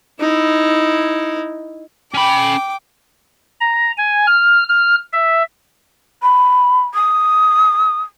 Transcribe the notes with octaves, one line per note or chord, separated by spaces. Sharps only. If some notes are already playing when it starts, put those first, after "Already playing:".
D#4 E4
C#4 G5 B5 D6
A#5
G#5
F6
F6
E5
B5
D#6